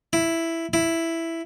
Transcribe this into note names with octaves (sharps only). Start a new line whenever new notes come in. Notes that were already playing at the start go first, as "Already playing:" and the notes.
E4
E4